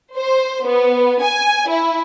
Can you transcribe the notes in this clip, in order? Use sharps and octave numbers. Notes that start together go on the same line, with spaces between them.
C5
B3
G#5
E4